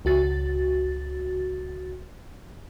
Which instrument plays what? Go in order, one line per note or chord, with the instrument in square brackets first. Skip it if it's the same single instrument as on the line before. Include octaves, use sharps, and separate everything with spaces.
[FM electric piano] C#2 F#4 A6